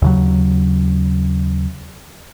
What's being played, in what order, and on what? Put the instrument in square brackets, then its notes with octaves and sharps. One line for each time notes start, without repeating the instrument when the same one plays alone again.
[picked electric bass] D#2 C#3 F#3